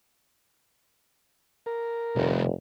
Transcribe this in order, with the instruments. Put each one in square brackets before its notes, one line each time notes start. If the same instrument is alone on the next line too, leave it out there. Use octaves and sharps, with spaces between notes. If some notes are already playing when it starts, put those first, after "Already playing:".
[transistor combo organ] A#4
[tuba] F1 [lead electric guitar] C2 A3